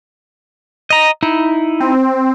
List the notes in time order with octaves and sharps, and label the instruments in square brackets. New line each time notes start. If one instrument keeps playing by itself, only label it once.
[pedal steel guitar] D#5 A#5
D#4 E4
[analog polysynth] C4